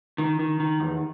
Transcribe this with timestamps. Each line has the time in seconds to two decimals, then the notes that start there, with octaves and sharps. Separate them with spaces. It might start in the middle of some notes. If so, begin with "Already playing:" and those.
0.18 D#3
0.39 D#3
0.60 D#3
0.80 E2